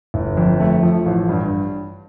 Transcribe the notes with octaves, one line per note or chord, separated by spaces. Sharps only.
G1
F2
A3
F3
A1
G2